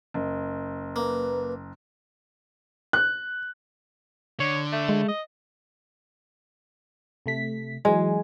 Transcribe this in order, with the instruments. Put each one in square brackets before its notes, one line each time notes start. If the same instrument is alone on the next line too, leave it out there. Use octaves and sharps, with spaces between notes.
[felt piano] F#1
[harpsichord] A#3 [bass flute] B4
[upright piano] F#6
[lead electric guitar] D3 [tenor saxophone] C#5
[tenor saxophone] A3
[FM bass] G#3
[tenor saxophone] D#5
[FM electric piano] C3 A3 B6
[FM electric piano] E3 F#3 G#5 [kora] G#3